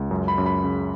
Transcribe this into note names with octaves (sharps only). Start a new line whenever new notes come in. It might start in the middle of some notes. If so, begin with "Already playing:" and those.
Already playing: C#2
F#2
B5
F#2
B5
C#3